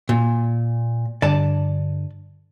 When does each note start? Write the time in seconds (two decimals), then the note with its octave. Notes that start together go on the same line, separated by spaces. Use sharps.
0.09 A#2
1.22 G2 D3 D5 A5